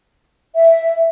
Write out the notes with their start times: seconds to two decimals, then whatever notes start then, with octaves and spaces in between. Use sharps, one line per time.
0.56 E5